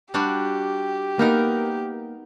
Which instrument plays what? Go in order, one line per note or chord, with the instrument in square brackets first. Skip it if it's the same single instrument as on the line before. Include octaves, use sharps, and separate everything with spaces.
[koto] G3 D4 F#4 [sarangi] G4
[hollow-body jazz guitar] A#3 [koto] B3 D#4 A#4